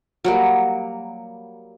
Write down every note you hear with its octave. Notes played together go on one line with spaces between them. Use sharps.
F#3 G3 A#3